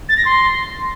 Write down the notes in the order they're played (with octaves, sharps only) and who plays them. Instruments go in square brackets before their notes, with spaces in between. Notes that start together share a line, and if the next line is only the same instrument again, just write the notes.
[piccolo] A6
A#6
C6